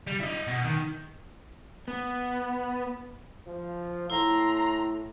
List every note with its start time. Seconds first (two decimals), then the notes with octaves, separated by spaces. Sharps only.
0.07 G3
0.20 E4 D#5
0.47 B2
0.65 D#3
1.88 B3
3.47 F3
4.10 A2 E4 A#5 C6